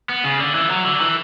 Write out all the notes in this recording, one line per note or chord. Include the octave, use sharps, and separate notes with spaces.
B3
C#3
D3
E3
F#3
D3
E3